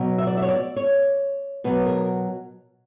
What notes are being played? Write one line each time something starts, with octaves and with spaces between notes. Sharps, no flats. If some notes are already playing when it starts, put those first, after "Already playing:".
Already playing: B2 F#3
E5
D5
E5
C#5
D5
C#5
B2 F#3 B4
A#4